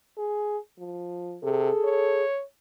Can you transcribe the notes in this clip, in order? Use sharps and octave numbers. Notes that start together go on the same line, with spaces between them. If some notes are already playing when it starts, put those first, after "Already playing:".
G#4
F3
C3 G#4 A4
C#5